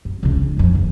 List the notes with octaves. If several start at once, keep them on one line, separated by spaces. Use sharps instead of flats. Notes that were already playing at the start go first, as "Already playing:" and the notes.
F#2
C#2 C#3
D4
F#1 F2
D#2